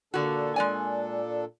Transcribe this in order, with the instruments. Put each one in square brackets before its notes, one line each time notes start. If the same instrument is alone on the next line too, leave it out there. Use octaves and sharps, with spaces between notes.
[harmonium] A#2 D4 A4 [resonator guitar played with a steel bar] D3 F#4
[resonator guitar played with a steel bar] G#3 D5 G#5